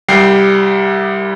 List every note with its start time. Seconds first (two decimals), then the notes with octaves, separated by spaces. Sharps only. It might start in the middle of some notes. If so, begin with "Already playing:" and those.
0.08 C2 G3 G5 C7